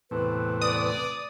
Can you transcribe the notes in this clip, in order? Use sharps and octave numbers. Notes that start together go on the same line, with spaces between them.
E2 A2 C3 B4
D5 D#6